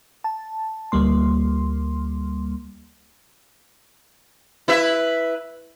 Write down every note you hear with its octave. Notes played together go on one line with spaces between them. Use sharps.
A5
D2 G3 A#3 C6
E4 B4 E5